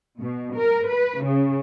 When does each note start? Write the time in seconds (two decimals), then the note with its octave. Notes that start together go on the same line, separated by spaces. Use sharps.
0.19 B2
0.56 A#4
0.89 B4
1.23 C#3